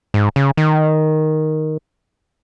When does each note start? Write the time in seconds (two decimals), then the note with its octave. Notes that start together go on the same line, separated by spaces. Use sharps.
0.14 G#2
0.36 C#3
0.57 D#3